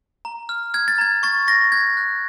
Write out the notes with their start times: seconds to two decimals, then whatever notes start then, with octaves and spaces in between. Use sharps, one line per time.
0.25 A#5
0.49 F6
0.74 F6 G#6
0.88 A6
0.98 A#5 G#6
1.23 C#6 A6
1.48 C#6 A#6
1.72 F#6 G#6
1.97 F#6